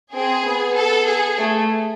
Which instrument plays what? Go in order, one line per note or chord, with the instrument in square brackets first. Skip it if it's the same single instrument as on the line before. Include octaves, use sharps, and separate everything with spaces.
[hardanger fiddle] C4 [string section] G#4
[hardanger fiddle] B3
[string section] A4
G#4
[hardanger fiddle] A3